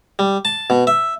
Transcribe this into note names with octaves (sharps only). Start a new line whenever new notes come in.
G3
A5
B2
E5